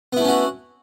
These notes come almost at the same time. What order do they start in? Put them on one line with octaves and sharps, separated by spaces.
B3 E4 A3 C#4 F#4